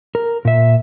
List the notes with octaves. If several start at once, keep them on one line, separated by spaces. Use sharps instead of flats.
A#4
A#2 E5